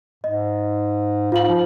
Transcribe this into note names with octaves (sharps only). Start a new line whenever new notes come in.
G#2 D#5
G#2 F4 F5 F#7
F3